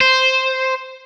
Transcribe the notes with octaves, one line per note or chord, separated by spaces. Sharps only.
C5